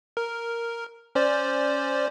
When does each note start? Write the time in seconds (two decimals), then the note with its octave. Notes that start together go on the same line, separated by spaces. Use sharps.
0.17 A#4
1.15 C#4 C5 D5